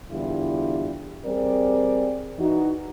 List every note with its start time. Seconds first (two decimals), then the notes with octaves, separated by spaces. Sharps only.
0.11 E2 D3 G3 E4 F4 G4
1.25 G3 C4 G#4 A#4 D5
2.39 E3 D#4 F#4